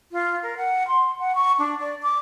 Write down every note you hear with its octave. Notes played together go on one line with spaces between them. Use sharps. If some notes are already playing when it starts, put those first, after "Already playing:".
F4
A#4
F#5
C6
F#5
C#6
D4
D5
D6